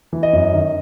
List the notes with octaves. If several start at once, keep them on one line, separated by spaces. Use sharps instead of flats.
E3
D#5
F#2
D#3